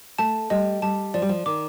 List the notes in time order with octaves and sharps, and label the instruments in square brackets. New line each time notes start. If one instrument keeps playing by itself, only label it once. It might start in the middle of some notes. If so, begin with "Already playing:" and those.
[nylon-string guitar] A3 [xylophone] A5
[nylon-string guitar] G3 [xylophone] D#5
[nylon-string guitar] G3 [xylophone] A5
[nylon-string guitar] F3 [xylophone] D5
[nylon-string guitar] G3
F3
[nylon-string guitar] D#3 [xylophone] D6